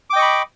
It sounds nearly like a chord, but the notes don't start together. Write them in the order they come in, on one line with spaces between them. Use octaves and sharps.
D6 G5 D#5 C#6 B5